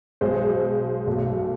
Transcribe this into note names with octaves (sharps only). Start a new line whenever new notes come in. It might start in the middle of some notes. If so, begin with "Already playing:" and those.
B1 B2 G#3 C5
B1 B2 A3